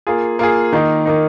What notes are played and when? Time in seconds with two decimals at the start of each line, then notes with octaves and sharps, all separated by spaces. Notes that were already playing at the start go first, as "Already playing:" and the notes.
0.07 A#3 F4 G#4
0.39 A#3 F4 G#4
0.73 D#3 A#3 D#4
1.06 D#3 A#3 D#4